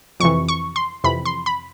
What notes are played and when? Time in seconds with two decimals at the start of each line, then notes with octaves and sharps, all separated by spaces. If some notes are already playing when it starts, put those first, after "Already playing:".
0.20 F2 C3 E3 C#6
0.49 C#6
0.76 C6
1.04 F2 C3 E3 B5
1.25 C6
1.46 B5